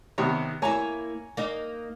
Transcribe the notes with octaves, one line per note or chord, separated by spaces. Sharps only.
C3 D#3 B3 C#5
A#3 E4 C#5 G#5 A#5
A#3 D#4 D#5